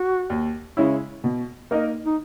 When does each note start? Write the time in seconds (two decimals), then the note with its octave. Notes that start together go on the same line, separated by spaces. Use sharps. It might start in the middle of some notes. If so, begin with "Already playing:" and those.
Already playing: F#4
0.30 D#2
0.77 C#3 G#3 C#4 E4
1.24 B2
1.71 A#3 D#4 A#4 D#5
2.05 D#4